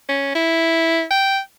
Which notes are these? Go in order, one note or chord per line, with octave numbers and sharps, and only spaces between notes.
C#4
E4
G5